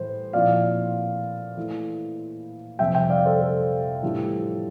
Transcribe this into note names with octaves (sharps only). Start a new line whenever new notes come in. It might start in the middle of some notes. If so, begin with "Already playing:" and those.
Already playing: A2 E3 G3 C5
A#2 F3 C4 E4 D5 F5
E3 A3 E4
F2 C3 G3 E5 G5
E5 G5
D5 F5
A4 C5
A4
A2 E3 G3 D4 F4